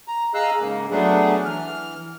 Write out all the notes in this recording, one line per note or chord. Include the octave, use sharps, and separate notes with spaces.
A#5
G#4 D#5 F5 A#5 E6 F#6
G#2 C#3 A#3
F#3 A3 B3 D4 G#4
E3 F6